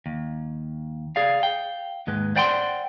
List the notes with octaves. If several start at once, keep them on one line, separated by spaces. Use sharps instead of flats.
D#2
G#4 D5 F5
F5 G5
D#2 G#2 G#3 B4
C5 D5 F#5 G5 A#5 C6